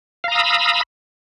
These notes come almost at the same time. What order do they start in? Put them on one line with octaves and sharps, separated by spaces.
F5 A#5 D#6 E6 B5